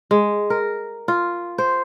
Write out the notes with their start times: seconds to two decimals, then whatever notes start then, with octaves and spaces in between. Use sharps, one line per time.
0.11 G#3
0.50 A#4
1.08 F4
1.58 C5